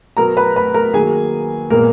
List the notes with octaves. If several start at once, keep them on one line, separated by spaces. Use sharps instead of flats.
B2 F#3 B3 A#4 A#5
B4 B5
B4 B5
A#4 A#5
D#3 F#3 A#3 G#4 G#5
A#2 G#3 A#3 B3 A#4